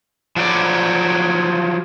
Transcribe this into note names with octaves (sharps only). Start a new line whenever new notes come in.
F3 F#3 D5